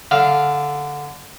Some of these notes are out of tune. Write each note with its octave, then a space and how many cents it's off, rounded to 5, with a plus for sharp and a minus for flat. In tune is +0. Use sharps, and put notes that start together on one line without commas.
D3 -5 F5 +0